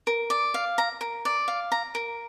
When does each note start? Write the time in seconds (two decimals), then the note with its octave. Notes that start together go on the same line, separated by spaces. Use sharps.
0.07 A#4
0.30 D5
0.54 F5
0.78 A#5
1.01 A#4
1.25 D5
1.48 F5
1.72 A#5
1.95 A#4